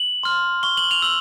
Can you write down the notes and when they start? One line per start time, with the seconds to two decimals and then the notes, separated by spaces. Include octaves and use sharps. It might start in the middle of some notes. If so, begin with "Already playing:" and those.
Already playing: F#7
0.23 C6 F6
0.63 C#6 G7
0.77 F#7
0.91 F7
1.02 E6 F#7